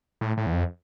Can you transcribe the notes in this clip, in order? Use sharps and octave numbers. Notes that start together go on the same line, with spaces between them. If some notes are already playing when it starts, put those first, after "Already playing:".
A2
A2
E2
F2